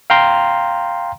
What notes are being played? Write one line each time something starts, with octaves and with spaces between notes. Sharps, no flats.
F5 G5 A#5 C6